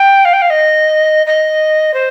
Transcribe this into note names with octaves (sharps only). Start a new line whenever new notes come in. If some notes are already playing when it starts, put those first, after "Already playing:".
Already playing: G5
F5
G5
F5
D#5
D#5
C5